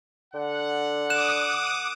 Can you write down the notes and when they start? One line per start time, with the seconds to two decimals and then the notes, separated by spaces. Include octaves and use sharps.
0.34 D3 F#5
1.10 D6 D#6 F#6 E7